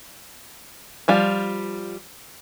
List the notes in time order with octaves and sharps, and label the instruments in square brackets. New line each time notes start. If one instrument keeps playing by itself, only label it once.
[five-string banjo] F3 G3 F4